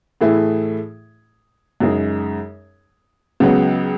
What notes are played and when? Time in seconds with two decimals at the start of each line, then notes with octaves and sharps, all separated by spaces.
0.21 A2 E3 A3 E4 G#4
1.80 F#2 C#3 G#3 D#4 G#4
3.40 C#2 C#3 F#3 B3